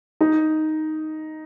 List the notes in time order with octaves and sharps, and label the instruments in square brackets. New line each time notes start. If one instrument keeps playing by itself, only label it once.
[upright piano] D#4